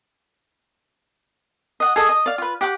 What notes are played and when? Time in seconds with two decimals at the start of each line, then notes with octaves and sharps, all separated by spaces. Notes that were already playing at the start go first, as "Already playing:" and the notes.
1.80 D#5 F#5
1.96 G#4 A4 D#5
2.09 D#5
2.26 D5 F5
2.38 F4 B4
2.61 G4 F#5 G5 D6